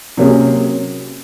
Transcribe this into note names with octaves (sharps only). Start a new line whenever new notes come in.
C3 F#3 A#3 C#4 G#4